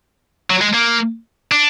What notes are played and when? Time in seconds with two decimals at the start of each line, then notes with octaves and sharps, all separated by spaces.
0.50 F#3
0.61 G#3
0.74 A#3
1.52 D4